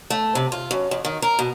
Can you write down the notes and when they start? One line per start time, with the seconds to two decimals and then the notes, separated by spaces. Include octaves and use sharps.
0.10 A3
0.35 C3
0.52 F4
0.71 F#2
0.91 F2
1.05 D#3
1.22 A#4
1.39 B2